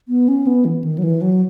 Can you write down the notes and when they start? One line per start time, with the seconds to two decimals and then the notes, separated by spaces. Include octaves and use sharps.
0.08 B3
0.28 C#4
0.47 B3
0.65 E3
0.84 D#3
0.98 F#3
1.03 E3
1.21 F#3